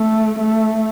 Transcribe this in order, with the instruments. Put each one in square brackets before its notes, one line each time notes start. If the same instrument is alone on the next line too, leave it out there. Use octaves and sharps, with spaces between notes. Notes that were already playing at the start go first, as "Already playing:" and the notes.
Already playing: [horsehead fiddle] A3
A3